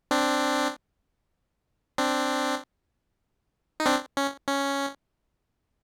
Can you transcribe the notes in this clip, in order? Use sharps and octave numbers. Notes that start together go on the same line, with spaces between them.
C4 D4
C4 D4
D#4
C4 D4
C#4
C#4